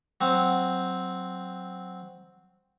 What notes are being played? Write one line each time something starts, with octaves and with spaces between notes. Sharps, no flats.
F#3 C4